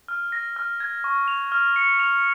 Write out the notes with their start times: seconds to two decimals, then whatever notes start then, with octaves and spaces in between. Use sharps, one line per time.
0.08 F6
0.32 A#6
0.56 F6
0.80 G#6
1.04 C#6
1.28 F7
1.52 F6
1.76 C#7
2.00 F7